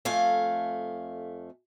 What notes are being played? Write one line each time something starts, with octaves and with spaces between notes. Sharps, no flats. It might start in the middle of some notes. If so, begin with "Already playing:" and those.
F2 A3 F5 G#5